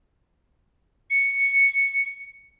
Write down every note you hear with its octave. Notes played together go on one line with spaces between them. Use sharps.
C#7